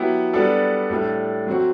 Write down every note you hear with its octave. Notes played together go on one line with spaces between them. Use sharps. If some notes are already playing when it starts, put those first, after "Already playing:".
Already playing: F#3 B3 E4 G4
G3 B3 D4 A4
A2 G3 D4 A4
F#3 C4 F#4